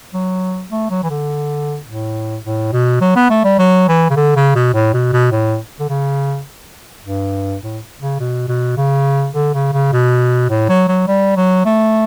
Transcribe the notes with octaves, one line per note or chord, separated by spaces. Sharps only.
F#3
A3
F#3
E3
D3
A2
A2
B2
F#3
B3
A3
G3
F#3
E3
C#3
D3
C#3
B2
A2
B2
B2
A2
D3
C#3
G2
A2
C#3
B2
B2
C#3
D3
C#3
C#3
B2
A2
F#3
F#3
G3
F#3
A3